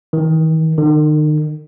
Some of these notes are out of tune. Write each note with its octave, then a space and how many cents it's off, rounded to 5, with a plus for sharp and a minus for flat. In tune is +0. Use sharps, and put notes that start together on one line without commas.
D#3 +40
D#3 -40